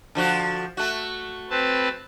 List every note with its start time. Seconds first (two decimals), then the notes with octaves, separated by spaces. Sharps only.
0.15 D3 F3 F#4
0.77 A3 F#4
1.50 C4 B4 A5